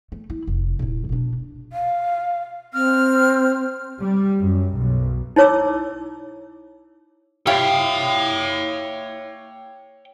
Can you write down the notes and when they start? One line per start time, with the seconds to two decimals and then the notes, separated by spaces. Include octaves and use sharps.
0.12 A3
0.30 E4
0.47 F1
0.79 D#1 E4
1.09 B2 D4
1.73 F5
2.74 C4 F6
4.01 G3
4.40 F#2
4.76 B1
5.36 D#4 E4 C#5 D6 E6
7.47 E4 F4 G4 C#5 F5 G5